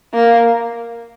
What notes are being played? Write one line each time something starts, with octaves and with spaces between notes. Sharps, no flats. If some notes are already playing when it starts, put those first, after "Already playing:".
A#3